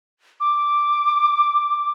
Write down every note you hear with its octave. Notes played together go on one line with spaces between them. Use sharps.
D6